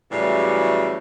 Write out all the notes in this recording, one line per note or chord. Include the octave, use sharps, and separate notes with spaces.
A2 C#3 E3 F#3 G3